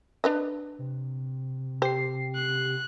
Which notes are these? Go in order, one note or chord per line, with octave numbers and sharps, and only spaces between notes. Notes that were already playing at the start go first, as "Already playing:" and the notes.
D4 B4 D#5
C3
G4 C5 C7
F#6